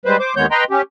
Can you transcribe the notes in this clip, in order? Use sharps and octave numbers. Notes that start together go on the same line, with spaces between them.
G3 G#3 B4 C5
C5 D6
D#2 D#3 G#3 B3 C#5 G6
B4 D#5 G5 A#5 C6
C#4 G4